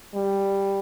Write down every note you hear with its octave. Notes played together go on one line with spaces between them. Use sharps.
G3